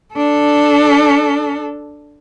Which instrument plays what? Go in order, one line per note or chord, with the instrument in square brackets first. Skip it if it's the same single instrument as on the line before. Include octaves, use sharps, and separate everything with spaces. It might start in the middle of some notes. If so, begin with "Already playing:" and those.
[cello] D4 A4